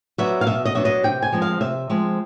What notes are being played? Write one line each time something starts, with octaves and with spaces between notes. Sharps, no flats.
F#3 B3 D4 E5
F5
B2 E5
D#5
F#3 B3 D4 E5
D#5
C3 G5
G#5
F3 G#3 C4
F5
C3 E5
F3 G#3 C4